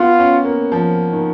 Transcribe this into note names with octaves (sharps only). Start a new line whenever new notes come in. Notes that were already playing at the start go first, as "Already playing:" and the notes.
Already playing: B3 F4
C#4
A#3
F3
D#3